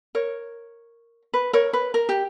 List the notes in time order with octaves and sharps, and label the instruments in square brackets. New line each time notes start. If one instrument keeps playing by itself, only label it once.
[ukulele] A#4 C#5
B4
A#4 C#5
B4
A#4
G4